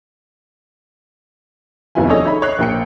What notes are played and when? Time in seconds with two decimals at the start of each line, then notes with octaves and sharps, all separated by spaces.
1.95 F1 D#2 B3 E4 F4 G#5
2.08 D4 G#4 A4 C#5 D#5
2.25 D#4 C#5 E5 B5
2.42 C#5 D#5 F#6 C7
2.58 A#1 A#3 G5 C#7